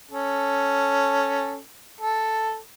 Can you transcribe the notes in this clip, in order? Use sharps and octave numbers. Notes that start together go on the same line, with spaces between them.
C#4 A4
A4